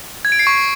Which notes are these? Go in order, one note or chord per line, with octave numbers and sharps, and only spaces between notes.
G#6
D7
C7
C#6